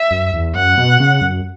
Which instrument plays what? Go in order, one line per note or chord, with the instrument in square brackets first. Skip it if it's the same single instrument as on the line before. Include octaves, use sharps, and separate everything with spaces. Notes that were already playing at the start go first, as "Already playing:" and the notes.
Already playing: [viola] E5
[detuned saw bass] F#2
E2
[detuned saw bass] F#2 [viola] F#5
[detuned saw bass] B2
C#3
F#2